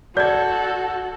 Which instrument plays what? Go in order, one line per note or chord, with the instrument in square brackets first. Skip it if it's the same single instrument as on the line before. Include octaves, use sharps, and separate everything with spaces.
[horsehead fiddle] F#4 [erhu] A4 [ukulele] D5 [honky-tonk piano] G6 G#6